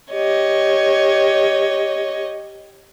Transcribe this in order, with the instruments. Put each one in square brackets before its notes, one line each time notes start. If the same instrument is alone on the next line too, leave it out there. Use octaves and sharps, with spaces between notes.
[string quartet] G4 C#5 D#5